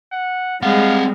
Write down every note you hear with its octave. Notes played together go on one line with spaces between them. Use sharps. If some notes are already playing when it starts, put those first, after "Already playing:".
F#5
G3 G#3 C4 F5 F#5